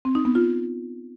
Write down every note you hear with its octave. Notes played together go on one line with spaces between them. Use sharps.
C4
D#4
B3
F4